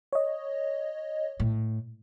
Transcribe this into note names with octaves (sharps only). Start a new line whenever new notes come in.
C#5 D#5
A2